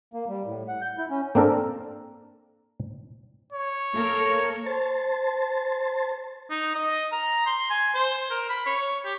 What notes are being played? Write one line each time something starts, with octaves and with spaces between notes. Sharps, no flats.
A#3
G3
A2
F#5
G6
E4
C#4
A#3 C4 D4 A4 A#4
C#5
A#3 A4 A#4
C5 A5
D#4
D#5
A#5
C6
G#5
C5
A#4
B5
C#5
G4